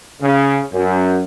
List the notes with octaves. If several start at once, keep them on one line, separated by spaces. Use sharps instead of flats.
C#3
F#2